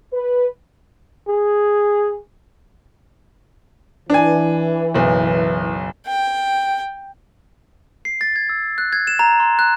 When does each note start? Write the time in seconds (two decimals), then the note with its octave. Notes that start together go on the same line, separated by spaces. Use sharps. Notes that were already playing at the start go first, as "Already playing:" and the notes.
0.12 B4
1.28 G#4
4.10 E3 D4 G#5
4.94 F#1 B1
6.07 G5
8.05 C7
8.21 A6
8.36 G#6
8.49 E6
8.78 F#6
8.93 G#6
9.07 E7
9.19 A#5
9.40 C6
9.59 F#6